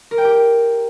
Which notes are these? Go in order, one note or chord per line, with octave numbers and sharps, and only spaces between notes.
A#4
G5
G4